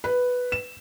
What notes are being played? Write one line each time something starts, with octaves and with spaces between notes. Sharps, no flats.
B4
E7